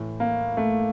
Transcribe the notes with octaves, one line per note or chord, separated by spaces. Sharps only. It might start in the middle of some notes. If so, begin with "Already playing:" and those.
Already playing: A2 E3
A#3
A3